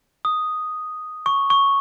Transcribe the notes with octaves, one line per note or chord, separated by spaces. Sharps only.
D#6
C#6
C#6